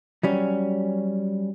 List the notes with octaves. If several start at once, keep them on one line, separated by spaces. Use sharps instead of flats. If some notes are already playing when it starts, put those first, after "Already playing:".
F#3 G3 C#4